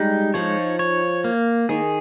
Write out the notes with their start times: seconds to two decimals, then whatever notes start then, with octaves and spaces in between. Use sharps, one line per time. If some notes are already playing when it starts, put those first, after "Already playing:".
Already playing: G3 G#3 D#4 G4
0.34 F3 F4 C#5
0.79 C#5
1.24 A#3
1.69 D#3 D#4 G#4